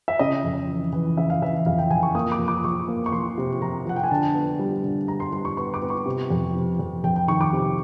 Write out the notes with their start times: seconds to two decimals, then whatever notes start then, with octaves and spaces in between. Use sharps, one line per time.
0.08 E5
0.19 C#3 D#5
0.44 F2
0.68 E3
0.93 E3
1.17 C#3 E5
1.30 F5
1.42 E3 E5
1.66 F2 F5
1.78 G5
1.91 F2 G#5
2.03 C#6
2.15 A#3 D#6
2.32 D6
2.39 F3
2.48 D6
2.64 F3 C#6
2.88 A#3
3.06 C#6
3.12 F3 C6
3.38 C3
3.62 F3 A#5
3.86 F3 F#5
3.96 G5
4.04 G#5
4.11 D3 A5
4.35 B3
4.59 G3
4.84 D3
5.08 G3 A#5
5.20 C6
5.33 G3 C6
5.45 C#6
5.57 B3 C#6
5.74 D6
5.82 B3
5.90 C#6
6.06 C3
6.30 F2
6.55 C3
6.79 F2
7.04 F2 G5
7.16 G5
7.28 D#3 C#6
7.41 D6
7.53 C3